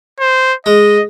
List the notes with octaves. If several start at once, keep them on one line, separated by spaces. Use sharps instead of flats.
C5
G#3 D#5